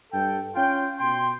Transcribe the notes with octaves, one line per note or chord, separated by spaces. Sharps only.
G2 A4 G5
C#4 F4 G5
B2 G5 C6